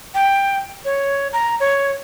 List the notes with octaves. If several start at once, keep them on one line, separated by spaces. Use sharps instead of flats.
G5
C#5
A#5
C#5